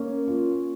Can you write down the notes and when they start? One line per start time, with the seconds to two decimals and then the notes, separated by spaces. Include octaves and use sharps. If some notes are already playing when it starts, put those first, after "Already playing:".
Already playing: A#3 C#4
0.28 F4